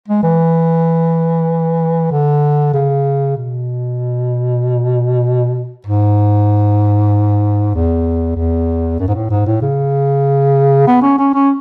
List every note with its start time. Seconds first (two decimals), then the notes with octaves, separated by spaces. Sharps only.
0.08 G#3
0.23 E3
2.11 D3
2.74 C#3
3.36 B2
5.86 G#2
7.75 E2
8.36 E2
8.99 F#2
9.08 G#2
9.14 A2
9.30 G#2
9.46 A2
9.62 C#3
10.87 B3
11.02 C#4
11.18 C#4
11.34 C#4